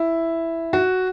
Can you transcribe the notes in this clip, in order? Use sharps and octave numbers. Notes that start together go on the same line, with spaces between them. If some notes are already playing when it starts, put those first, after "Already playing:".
Already playing: E4
F#4